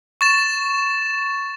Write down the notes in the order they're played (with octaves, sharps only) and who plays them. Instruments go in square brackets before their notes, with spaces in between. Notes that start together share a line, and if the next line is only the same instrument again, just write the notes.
[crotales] C#6 A6 E7